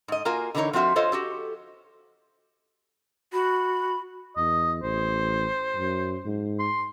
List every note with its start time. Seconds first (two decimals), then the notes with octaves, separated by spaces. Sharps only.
0.08 G#2 D#5
0.25 A#3 F4 F#4 A#4 G#5
0.55 D3 E3 D4 D#4 A#4 C#5
0.73 F3 C4 F4 F#4 E5
0.96 F4 A4 C5 C#5 D#5 F5
1.12 F#4 G4 A4
3.33 F#4 B5
4.37 E2 D#5
4.83 A1 C5
5.76 F#2
6.25 G#2
6.59 C6